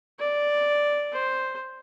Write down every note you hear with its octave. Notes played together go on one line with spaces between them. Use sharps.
D5
C5